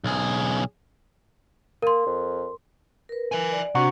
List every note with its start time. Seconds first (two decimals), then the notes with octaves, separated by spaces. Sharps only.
0.04 B1 G#4
1.82 A#3 A#4 C6
2.06 F2
3.09 A#4 B4
3.32 E5 G#5
3.52 D5
3.75 C3 D4 F#4 F#5 A#5 C#6